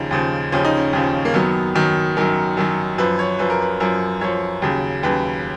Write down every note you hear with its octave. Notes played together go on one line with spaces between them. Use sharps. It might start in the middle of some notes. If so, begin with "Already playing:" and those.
Already playing: D#2 C#3 F3 D#4
D#2 C#3 F3
D#2 C#3 F3 C#4
D#4
C#4
D#2 C#3 F3
A#3
F#2 D#3 F#3 B3
F#2 D#3 F#3
F#2 D#3 F#3 A#4
F#2 D#3 F#3
F#2 F3 B4
C#5
F#2 F3 B4
A#4
B4
F#2 F3 A#4
F#2 F3 C#5
D#2 C#3 F#3
D#2 C#3 F#3 B4